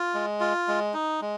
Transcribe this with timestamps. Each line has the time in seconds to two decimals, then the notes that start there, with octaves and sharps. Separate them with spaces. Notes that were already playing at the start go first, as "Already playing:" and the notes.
Already playing: F4
0.14 G#3
0.40 F4
0.68 G#3
0.94 D#4
1.21 G#3